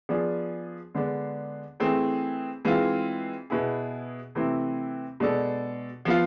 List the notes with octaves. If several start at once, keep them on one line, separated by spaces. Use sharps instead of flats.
F3 B3 D4 G#4
D3 G#3 B3 D4
E3 A3 C4 G#4
E3 G#3 C4 F4
B2 B3 E4 G#4
C3 E3 A3 C4 E4
B2 G#3 D4 A4
F3 B3 F4